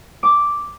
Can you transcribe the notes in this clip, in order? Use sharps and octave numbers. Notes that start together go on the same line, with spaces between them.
D6